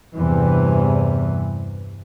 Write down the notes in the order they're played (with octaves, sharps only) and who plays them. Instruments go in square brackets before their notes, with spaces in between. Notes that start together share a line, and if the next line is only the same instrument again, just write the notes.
[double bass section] E2 G2 C3 E3